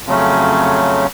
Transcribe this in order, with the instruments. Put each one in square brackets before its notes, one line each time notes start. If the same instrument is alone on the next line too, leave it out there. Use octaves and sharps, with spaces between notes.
[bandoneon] F2 C#3 F#3 A3 C#4